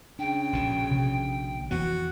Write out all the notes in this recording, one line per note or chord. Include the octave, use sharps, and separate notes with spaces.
C#3 D4 G5
A#1 B2 D3
C3
F2 E3 B3 F#4